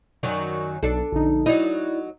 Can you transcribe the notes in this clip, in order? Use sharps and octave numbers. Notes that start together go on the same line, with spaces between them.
F#2 D#3 F#3 D5
B1 D4 A4
A#1 D3 D#4
F#3 D#4 E4 D5